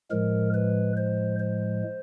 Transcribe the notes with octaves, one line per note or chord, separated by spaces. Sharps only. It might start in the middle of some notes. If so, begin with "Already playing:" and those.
A2 F3 G#3 A#4
B4
C5
C5